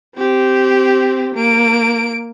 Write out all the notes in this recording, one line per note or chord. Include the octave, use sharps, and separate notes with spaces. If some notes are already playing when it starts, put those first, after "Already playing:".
C4 G4
A#3 D7